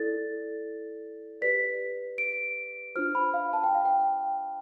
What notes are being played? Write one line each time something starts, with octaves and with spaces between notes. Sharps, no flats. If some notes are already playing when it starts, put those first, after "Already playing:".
Already playing: E4 A4 D5 A6
G4 B4 D5 B6
D7
D4 F4 C5 F6
B5
F5
A5
G5
F5
G5